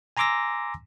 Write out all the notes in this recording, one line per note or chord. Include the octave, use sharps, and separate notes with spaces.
G#5 A#5 C6 D6 E6 A#6